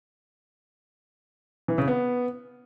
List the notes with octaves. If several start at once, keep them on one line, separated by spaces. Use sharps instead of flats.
E3
C#3
B3